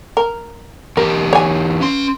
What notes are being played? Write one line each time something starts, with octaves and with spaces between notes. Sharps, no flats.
A#4
E2 G4 A#4
C#5 G#5
C#4 C6